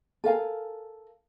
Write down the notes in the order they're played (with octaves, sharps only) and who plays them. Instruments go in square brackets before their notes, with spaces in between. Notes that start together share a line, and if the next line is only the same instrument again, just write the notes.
[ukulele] A4 A#4 F5 G#5